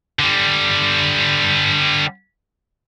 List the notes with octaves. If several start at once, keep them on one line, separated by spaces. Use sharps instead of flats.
D3 G3